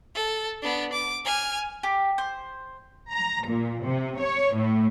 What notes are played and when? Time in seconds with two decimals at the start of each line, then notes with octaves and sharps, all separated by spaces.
0.15 A4
0.62 B3 D4
0.93 D6
1.25 G#5 F6
1.83 G4
2.18 C5
3.11 A#5
3.46 A#2
3.85 C3
4.19 C#5
4.55 A2